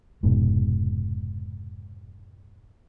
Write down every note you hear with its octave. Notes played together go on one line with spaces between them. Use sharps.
F1 G#2 B2